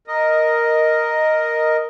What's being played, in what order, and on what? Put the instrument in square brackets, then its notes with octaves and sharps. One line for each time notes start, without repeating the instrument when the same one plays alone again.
[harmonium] A#4 D#5